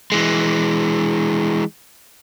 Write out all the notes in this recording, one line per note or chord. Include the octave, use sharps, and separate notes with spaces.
E3 G#3